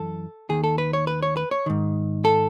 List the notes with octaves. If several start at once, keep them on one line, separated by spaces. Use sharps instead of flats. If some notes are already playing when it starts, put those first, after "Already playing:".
Already playing: F#2 E3 A4
D#2 D#3 G#4
A4
B4
C#5
B4
C#5
B4
C#5
G#2 D#3
A4